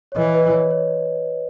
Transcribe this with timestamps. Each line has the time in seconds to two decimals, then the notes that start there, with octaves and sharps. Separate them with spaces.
0.12 C#5
0.16 E3 B4 D#5
0.35 B4 D#5
0.52 C#5
0.71 C#5